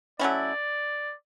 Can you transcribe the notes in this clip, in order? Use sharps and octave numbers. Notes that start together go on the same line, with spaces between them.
F#3 A3 C#4 E4 D5